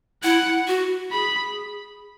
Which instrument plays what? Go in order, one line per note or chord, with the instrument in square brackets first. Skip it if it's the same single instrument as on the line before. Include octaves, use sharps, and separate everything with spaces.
[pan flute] E4 [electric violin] F#5
[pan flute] F#4
[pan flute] G#4 [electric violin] B5